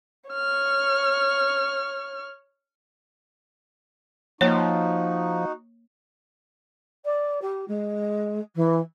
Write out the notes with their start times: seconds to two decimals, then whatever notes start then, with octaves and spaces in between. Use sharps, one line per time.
0.30 C#5 F6
4.41 F3 A#3 D#4 F#4 C#5
7.04 D5
7.41 G4
7.68 G#3
8.55 E3